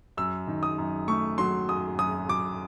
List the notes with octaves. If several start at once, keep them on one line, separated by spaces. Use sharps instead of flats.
F#2 E6
D#3
D#6
F#2
A3 C#6
F#3 C6
F#2 D#6
F#2 D#6
F#2 D6